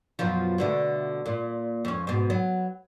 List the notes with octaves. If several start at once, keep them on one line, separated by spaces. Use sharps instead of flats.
F#2 B2 F3
B2 D3 A3
A#2
F2 C#4
G#2 B2
F#3 B3